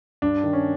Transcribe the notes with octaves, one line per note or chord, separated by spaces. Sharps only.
G2 D4
D#3
C#4